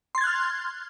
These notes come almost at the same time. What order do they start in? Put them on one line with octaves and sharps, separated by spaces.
C6 A6 G#6 F#6 F6